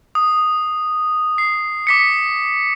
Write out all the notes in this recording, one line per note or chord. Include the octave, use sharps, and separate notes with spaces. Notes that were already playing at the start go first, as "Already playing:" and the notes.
D#6
C7
D6 B6 C#7